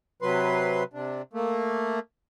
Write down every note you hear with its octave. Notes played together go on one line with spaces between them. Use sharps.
C3 F#3 B4 C6
C3 D4
A3 A#3